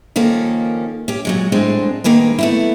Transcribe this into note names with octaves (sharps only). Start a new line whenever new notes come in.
D#3 F3 A#3 C#4 A4
C#4 G4
A#2 F#3 G#3
A2 G#3 C4 D4
D2 D#3 A#3 G#4 B4
A3 B3 E4